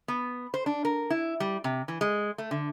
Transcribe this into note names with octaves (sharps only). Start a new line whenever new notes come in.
B3
C5
D4
A#4
E4
G3
C3
E3
G#3
A3
D3